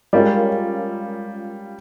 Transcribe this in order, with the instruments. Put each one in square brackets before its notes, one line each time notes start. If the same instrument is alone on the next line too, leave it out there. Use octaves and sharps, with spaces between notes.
[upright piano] G3 [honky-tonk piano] G#3 C#4 F4 A#4 D5